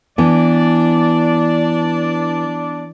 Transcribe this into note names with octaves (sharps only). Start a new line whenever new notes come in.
E3 B3 D4 D5